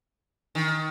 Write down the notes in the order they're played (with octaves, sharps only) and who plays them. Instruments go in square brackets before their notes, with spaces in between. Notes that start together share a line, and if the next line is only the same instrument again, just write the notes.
[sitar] D#3